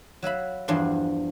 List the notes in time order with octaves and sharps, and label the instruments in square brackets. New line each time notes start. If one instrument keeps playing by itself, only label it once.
[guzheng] F#3 E5 F5 B5
E2 G2 F3 D4 C6